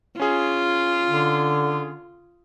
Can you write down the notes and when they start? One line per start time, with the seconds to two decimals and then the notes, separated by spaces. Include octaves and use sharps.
0.20 C#4 F4 G#4
1.05 D3